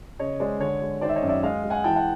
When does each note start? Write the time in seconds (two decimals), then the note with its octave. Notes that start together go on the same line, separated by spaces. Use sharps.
0.19 C#3 C#5 D#5
0.40 G#3 C5 D5
0.60 D3 C#5
0.82 G#3
1.01 D#3 C5 D5
1.09 E5
1.16 C#5 D#5
1.23 F#2
1.29 D5 E5
1.43 G#3 D#5 F5
1.64 G#3
1.70 F#5 G#5
1.84 E3 G5 A5
1.96 F#5